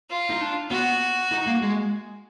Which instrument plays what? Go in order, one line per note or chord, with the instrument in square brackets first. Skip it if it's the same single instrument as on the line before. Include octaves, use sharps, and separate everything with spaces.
[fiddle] F4
[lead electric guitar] D#4
D4
[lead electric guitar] B3 [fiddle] F#4
[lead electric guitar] D#4
A#3
G#3